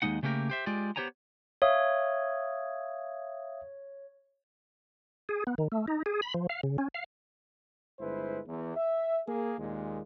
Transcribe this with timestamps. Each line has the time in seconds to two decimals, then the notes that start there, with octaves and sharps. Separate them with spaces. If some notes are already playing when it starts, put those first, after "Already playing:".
0.02 D#2 G#2 G#3 D#4 F#5
0.23 C#3 A3 A#3 G4 A#4
0.50 G4 C5 E5
0.66 G#3 F4 G4 D5
0.96 B3 G4 C5 C#5 G#5 A#5
1.62 C#5 E5 F5 D#6
5.29 G#4
5.47 B3
5.58 D#3
5.72 A3
5.88 D#4
6.06 G#4
6.22 B5
6.34 F3
6.49 F5
6.63 C#3
6.78 C#4
6.95 F5
8.00 G1 G#3 E4 B4 C5
8.46 E2
8.76 E5
9.27 A#3 G#4
9.59 D#2 A#2 G#3